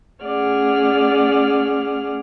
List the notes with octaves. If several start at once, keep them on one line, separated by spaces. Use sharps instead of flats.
A3 C#4 G#4 D5 F#5 F6